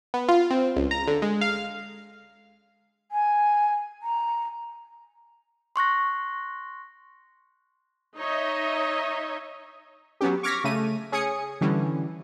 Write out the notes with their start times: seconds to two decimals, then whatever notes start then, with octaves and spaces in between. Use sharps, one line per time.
0.14 B3
0.29 F4
0.51 C4
0.76 C#2
0.91 A#5
1.08 D3
1.22 G#3
1.41 F5
3.12 G#5
4.03 A#5
5.76 C6 C#6 F#6 A#6
8.17 D#4 C#5 D#5 E5
10.21 F#3 B3 C#4 G4
10.43 C#6 D6 F6 G#6 A#6 B6
10.64 C#3 A3 D#7
11.12 C#4 G#4 G#5 D#6 C#7
11.61 D3 E3 G3 C#4